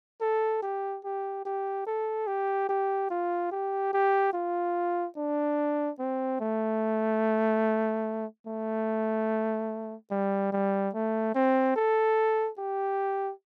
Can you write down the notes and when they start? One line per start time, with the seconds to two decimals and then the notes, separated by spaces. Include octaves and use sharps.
0.21 A4
0.62 G4
1.04 G4
1.45 G4
1.87 A4
2.27 G4
2.69 G4
3.11 F4
3.52 G4
3.93 G4
4.33 F4
5.17 D4
5.99 C4
6.40 A3
8.47 A3
10.11 G3
10.52 G3
10.94 A3
11.35 C4
11.76 A4
12.58 G4